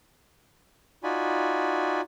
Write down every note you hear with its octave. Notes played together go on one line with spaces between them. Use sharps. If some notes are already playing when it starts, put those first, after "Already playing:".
D#4 F4 F#4 D5 G#5 B5